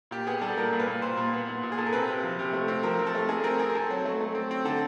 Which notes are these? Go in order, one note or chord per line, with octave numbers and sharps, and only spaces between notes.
A#2 G4
B3 G#4
G3 A4
A#2 A#4
A#2
B4
A#2
A#2 C5
A#2
B3
A#2
A#2
G#4
A#2 A4
A#4
C4 B4
C3
F3
C3
A3
C4
F3 A#4
C4
A4
A3
A3 G#4
C4 A#4
C4 G#4
A#4
C4 A4
F#3
A3
A3
C4
C4
D3 A4